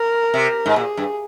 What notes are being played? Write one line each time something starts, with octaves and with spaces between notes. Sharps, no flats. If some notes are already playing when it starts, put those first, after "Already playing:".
Already playing: A#4
C3
G#2
A#2 G#4
G2